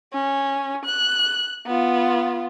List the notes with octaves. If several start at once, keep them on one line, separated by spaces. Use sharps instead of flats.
C#4
F#6
B3 F4